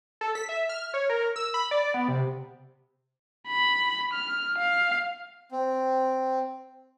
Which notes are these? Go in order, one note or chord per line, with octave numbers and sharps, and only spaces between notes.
A4
B6
E5
F6
C#5
A#4
E6
B5
D5
B3
C3
B5
F6
F5
C4